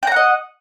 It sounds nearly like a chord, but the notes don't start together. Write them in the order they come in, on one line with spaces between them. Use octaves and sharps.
G5 A#5 F#5 D#5